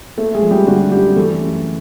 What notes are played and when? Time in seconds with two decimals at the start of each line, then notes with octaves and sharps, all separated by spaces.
0.18 A3 A#3 A4
0.35 G#3 G#4
0.42 F3
0.51 G3 G4
0.67 D3 F#4
0.92 F#2 G3 G4
1.17 E3 A3 A4
1.41 F#2